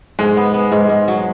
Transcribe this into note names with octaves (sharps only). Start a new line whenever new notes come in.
G#2 G#3
B3
B3
G#2
G#2
F#3